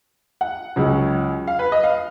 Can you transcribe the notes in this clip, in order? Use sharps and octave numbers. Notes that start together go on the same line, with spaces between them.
F#5
C#2 C#3 F#3
F5
B4
D#5
F5